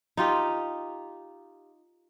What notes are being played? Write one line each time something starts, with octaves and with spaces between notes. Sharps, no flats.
D#4 F4 G4